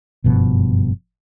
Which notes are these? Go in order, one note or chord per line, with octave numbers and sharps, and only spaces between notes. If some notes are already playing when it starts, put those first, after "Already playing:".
F#1 G2 B2 F3